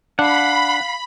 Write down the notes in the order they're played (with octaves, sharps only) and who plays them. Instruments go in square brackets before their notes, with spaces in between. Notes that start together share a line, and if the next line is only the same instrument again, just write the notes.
[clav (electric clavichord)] D4 [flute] F5 [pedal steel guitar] F#5 [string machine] B5